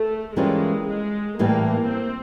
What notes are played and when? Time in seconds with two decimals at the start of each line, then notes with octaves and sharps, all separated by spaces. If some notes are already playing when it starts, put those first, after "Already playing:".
Already playing: A3
0.36 E3 G3 G#3 A#3 C#4 F4
0.88 G#3
1.39 A2 E3 G3 A#3
1.89 C4